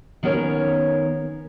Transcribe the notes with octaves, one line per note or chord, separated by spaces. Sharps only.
D#3 B3 C#4 A#4 C#5